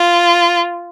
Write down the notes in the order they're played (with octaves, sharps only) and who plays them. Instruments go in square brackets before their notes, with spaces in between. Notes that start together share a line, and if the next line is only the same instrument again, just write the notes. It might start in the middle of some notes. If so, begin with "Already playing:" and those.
Already playing: [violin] F4